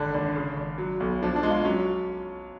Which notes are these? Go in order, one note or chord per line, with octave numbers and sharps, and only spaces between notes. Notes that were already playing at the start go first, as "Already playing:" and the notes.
Already playing: G#1 D3 D4
G#1 D4
C#3
G#1
F#3
B1
F3 D4
D4
G#3
F4
F#3 C#4